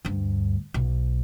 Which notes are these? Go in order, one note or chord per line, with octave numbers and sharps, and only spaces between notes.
D2 G2
B1